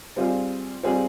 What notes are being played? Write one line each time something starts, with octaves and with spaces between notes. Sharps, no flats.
G3 C4 F4 G#4
G3 C4 F4 G#4